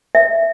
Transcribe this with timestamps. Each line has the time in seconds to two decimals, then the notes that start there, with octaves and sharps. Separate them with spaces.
0.15 E5